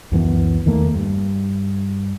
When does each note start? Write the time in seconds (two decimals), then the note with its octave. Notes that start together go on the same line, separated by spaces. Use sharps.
0.11 C#2 F#2 E3 B3
0.66 E2 D#3 A3 A#3
0.94 G2